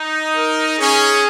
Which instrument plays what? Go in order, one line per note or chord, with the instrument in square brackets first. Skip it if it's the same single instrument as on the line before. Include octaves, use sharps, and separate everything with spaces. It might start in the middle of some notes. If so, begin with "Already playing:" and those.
Already playing: [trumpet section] D#4
[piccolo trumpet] A#4
[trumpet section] C#4 [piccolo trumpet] G#4